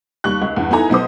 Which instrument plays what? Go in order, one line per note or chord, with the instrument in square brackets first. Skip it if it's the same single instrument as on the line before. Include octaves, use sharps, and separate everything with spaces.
[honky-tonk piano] D#2 G3 C#6 F#6
C#2
E2 G2
B3 D#4 E4 A4 G#5 A#5
B1 B3 C5 D#6